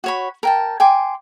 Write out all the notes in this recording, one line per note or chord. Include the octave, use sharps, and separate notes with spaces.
F#4 C#5 B5
A#4 G5 A5
G5 G#5 C6 D6